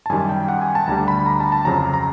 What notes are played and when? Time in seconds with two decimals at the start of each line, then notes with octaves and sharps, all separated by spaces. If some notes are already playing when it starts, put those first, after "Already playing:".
0.06 A5
0.10 F#2 D#3 G3 G#5
0.29 G5
0.48 F#5
0.61 G#5
0.75 A5
0.87 D2 D3 G3 A#5
1.08 B5
1.26 A#5
1.40 A5
1.52 A5
1.65 F2 C#3 F#3 A#5
1.94 A#5